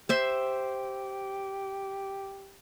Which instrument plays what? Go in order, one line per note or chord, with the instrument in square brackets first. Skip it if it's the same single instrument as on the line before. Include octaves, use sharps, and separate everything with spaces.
[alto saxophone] G4 [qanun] C5 E5 C6